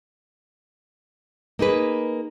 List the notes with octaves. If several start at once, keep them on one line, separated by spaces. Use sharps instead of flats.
A#3 D#4 G#4 B4